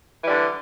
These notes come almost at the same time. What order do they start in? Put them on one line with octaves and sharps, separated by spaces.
E3 G3 D3